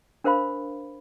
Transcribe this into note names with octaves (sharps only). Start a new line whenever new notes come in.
D4 A#4 C5 F5 B5